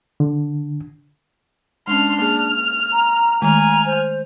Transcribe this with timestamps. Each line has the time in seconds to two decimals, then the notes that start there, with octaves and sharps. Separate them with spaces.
0.20 D3
1.87 G#3 C#4 D4 C6 F6
2.19 A#3 G#4 F6
2.92 A#5
3.42 D#3 G#3 A3 G#5 F6
3.86 C5